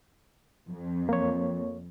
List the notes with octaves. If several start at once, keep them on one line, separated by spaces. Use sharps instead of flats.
F2
A#3 C#5